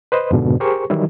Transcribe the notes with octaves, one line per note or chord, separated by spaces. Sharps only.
B4 C5 D#5
F2 G#2 B2 D3
G4 G#4 A#4 C5 C#6
D#3 E3 F#3 G3 E4